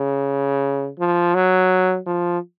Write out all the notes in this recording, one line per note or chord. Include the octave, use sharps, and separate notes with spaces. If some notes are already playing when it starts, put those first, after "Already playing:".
Already playing: C#3
F3
F#3
F3